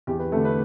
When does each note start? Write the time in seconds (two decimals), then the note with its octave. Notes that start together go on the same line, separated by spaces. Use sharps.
0.07 E2 G4
0.19 B4
0.32 D3 A3 A4
0.45 B4